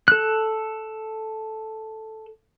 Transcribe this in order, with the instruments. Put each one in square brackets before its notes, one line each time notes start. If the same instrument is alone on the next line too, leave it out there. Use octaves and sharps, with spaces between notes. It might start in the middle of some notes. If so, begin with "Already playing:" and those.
[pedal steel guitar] A4 F#6